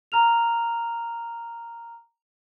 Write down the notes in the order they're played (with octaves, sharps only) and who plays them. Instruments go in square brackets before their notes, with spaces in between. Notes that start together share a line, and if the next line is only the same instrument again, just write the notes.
[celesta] A#5 F6 F7